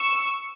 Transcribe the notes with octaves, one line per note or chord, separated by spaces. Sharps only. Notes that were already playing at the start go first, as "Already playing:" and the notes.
Already playing: C#6 E6